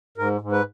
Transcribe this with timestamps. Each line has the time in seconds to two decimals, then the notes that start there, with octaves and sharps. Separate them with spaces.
0.18 G#2 A#4
0.41 G#2
0.52 B4